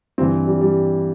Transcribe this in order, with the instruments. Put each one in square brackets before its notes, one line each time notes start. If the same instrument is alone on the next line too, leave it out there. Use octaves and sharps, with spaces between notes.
[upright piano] G2 C4
E3
G3
G3